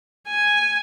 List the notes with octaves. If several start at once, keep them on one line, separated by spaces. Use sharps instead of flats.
G#5